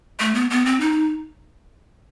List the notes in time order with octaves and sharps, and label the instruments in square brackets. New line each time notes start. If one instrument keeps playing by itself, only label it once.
[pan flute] A3
B3
B3
C4
D#4